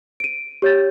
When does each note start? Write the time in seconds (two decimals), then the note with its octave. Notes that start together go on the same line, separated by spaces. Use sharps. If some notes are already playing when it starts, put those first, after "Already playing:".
0.20 D7 D#7
0.62 G4 C#5 G6 A6